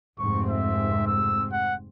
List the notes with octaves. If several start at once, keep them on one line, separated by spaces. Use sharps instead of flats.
F1 G#2 C4 C#6
E5
E6
F#5